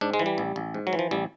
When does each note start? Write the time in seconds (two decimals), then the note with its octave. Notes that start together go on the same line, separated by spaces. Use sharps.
0.01 G#2 D4
0.14 G#3
0.19 E3
0.26 G3
0.38 A1
0.56 A1
0.74 G#2
0.87 F#3
0.93 E3
0.99 F3
1.11 A1 G3